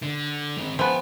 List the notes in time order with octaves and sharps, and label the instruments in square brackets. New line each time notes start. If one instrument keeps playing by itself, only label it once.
[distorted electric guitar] D3
D#3 C4
[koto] F3 B3 [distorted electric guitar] G5 G#5